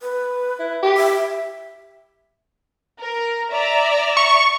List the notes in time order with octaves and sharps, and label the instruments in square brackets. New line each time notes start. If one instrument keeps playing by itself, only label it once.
[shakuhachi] B4
[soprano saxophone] E4
G4
[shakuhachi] E5
[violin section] A#4
D5 E5 A#5
[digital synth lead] C#6